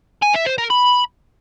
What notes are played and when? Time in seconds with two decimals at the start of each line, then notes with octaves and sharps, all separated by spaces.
0.22 G#5
0.34 E5
0.46 C5
0.58 A#4
0.70 B5